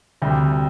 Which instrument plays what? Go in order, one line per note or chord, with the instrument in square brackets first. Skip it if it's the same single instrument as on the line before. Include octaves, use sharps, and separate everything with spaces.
[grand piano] D2 C3 G3